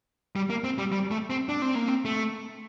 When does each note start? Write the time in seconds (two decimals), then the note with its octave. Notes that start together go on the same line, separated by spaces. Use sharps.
0.36 G3
0.50 A#3
0.64 C4
0.78 G3
0.92 G3
1.11 A3
1.30 C4
1.49 D4
1.62 C4
1.75 A#3
1.88 C4
2.05 A3